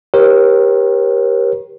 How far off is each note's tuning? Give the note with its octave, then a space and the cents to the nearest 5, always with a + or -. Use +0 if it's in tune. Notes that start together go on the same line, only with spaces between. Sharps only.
G4 +0 A#4 +30 C#5 -45